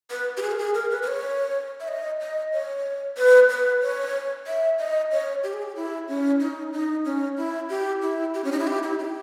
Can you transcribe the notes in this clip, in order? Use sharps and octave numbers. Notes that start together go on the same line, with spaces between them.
B4
G4
G#4
A#4
G#4
A#4
B4
B4
C#5
E5
D#5
D#5
C#5
B4
B4
C#5
E5
D#5
C#5
G4
G#4
G4
E4
C#4
D#4
D#4
C#4
E4
G4
E4
G4
C#4
D#4
E4
G4
E4
G4